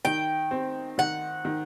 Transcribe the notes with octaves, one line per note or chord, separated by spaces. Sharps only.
D#3 G5
C4
D#3 F#5
D#3